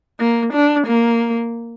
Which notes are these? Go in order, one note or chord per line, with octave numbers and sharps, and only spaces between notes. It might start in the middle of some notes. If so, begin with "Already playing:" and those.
A#3
D4
A#3